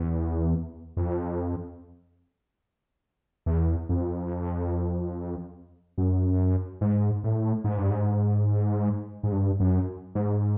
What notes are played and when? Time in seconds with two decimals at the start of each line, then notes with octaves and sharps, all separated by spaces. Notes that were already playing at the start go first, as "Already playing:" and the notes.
Already playing: E2
0.97 F2
3.46 E2
3.89 F2
5.98 F#2
6.81 G#2
7.23 A2
7.64 G#2
7.78 G2
7.90 G#2
9.23 G#2
9.32 G2
9.60 F#2
10.15 G#2